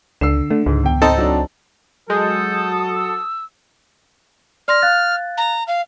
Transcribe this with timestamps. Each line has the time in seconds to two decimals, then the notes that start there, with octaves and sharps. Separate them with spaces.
0.21 C#2 D3 E6 C7 E7
0.51 D3 A3
0.66 C#2 G#2
0.83 E2 G5
1.02 G#1 C4 D#4 A4
1.18 F#3 D4
2.10 F#3 G#3 F#4 A4 D#6 G6
2.95 E6
4.68 D5 C6 F6 A#6
4.82 F5 F#6 A6
5.38 A#5
5.68 F5